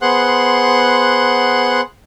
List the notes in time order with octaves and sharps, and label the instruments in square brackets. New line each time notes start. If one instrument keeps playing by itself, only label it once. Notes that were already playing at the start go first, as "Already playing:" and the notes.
[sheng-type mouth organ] B3 G#4 C5 F#5 C6 F#6